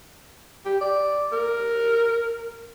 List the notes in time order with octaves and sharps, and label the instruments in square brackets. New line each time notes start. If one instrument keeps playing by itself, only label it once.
[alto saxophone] G4
D5
A#4